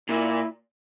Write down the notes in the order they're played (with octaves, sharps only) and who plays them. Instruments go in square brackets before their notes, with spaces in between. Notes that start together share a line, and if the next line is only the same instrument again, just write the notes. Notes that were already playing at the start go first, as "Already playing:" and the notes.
[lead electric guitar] A#2 [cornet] E4